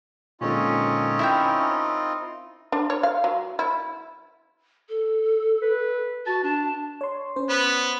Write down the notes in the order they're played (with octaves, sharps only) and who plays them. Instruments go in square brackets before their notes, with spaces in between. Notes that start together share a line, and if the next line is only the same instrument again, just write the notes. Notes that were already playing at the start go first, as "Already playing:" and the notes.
[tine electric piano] A#2 D3 G#3 [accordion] C4 D#4 F4 [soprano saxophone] C#4
[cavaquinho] E4 A#4 G5 [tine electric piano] E6
[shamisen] D4
C#5
F5
F#3
E4
[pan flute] A4
[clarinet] B4
[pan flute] F#4 [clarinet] A5
[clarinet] D4 [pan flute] A5
[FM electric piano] C#5 C6
C#4 C5
[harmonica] B3 B4